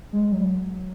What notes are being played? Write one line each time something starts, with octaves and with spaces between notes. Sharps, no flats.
G#3
F#3